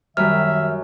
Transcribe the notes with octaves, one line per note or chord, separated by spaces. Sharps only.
F#2 D#3 G3 E5 F6